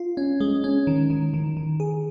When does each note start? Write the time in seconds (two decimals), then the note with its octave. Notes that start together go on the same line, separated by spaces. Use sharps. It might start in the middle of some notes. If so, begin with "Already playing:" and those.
Already playing: F4
0.17 C#4
0.40 G#3
0.64 C#4
0.87 D#3
1.10 D#3
1.34 D#3
1.57 D#3
1.80 G#4